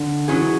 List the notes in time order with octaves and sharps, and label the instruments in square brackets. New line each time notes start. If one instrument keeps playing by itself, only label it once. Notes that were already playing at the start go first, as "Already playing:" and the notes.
Already playing: [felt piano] D3
[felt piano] E3 [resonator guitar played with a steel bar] F#3 C#4 G#4